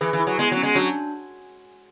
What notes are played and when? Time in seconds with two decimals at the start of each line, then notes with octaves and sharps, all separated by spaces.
0.01 E3 G#4 B4
0.13 E3
0.20 E4
0.27 F#3
0.39 G#3 B3
0.52 F#3
0.57 C#4
0.63 G#3
0.75 F#3 D4